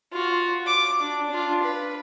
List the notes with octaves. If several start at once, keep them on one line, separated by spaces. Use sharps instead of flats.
F4 F#4
D6
D4
D4 F4
B4